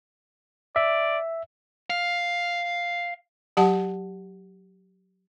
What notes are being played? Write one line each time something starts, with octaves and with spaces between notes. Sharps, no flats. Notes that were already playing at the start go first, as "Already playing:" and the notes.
D5 E5
F5
F#3 G4 F#5 A5